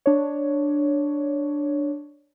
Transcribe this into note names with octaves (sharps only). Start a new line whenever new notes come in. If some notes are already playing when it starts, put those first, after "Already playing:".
D4 C#5